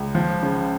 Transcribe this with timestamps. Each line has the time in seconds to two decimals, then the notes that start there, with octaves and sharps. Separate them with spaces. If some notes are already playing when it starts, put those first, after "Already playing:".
Already playing: C#2
0.15 F3
0.43 C#3